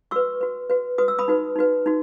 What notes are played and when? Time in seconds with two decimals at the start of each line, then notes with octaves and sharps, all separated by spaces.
0.11 F#4 B4 C#6 E6
0.41 F#4 B4
0.70 F#4 B4
0.98 F#4 B4 D#6
1.08 E6
1.19 B5 D#6
1.28 D#4 F#4 B4
1.56 D#4 F#4 B4
1.86 D#4 F#4